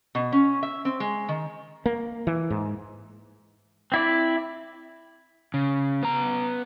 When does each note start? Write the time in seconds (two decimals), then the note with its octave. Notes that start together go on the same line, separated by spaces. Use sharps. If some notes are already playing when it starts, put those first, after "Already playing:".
0.15 B2
0.32 C#4
0.63 E5
0.85 C4
1.00 G#3
1.29 D#3
1.86 A#3
2.27 E3
2.50 G#2
3.92 C4 E4 D5
5.54 C#3
6.03 B3 A#5